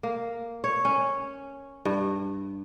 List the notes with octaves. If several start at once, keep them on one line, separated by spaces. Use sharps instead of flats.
A#3
C#5
C#4
G2